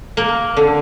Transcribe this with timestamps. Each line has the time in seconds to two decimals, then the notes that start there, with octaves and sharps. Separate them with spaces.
0.17 A#3
0.57 D3